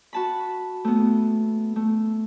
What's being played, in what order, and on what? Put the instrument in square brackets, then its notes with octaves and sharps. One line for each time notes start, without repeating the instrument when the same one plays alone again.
[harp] F#4 A5 B5
A3 B3
A3